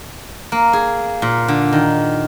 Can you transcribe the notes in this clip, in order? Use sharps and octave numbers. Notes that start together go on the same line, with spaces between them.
A#3
G#4
A#2
D3
D#3